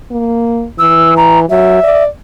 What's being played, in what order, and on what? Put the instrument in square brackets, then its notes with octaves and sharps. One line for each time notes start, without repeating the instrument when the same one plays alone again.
[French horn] A#3
[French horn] E3 [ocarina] E6
[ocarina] A#5
[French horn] F#3 [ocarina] E5
[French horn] D5